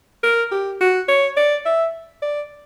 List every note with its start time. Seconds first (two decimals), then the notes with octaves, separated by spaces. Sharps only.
0.24 A#4
0.51 G4
0.81 F#4
1.09 C#5
1.37 D5
1.66 E5
2.22 D5